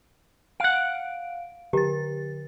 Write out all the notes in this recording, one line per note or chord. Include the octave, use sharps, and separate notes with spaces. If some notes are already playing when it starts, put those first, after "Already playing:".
F5 F#5 D7
D3 G4 A#5 A6